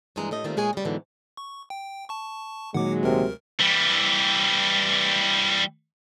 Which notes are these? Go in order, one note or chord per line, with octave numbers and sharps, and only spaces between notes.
G2 A#2 D#3 E3 G#3 A#5
A2 A3 D#5
D#3 G3 A3 A#3 C4 F4
A#2 G#3 G#4 C#5 G#5
C#3 G3
G#2 B2 D3 E3 F#3
C#6
G5
A5 C#6
A#2 D#3 F#3 G#3 F#5 D6
D2 C3 A#4
E3 G3